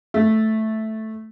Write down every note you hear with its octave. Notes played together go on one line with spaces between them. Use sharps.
A3